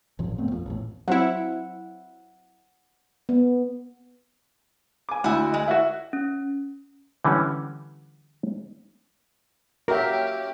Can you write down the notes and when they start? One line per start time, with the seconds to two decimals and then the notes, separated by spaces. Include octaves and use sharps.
0.19 G#1 F#2 A#2 F3
0.38 D#1 A3 B3 C4
0.51 A#1 F2 F3
0.66 A1 E2 A2
1.08 F#3 C4 E4 F#5
3.29 B3
5.09 G#5 D6
5.24 D2 E4 F#4
5.54 G#3
5.68 E4 F#4
6.13 C#4
7.25 D3 E3 G3 C#4
9.88 A#3 C#4 F#4 G4 A#4 E5 G5